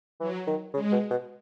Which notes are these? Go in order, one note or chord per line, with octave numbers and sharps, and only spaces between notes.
E3 F#3
D#3
C#3 G#3
B2
B2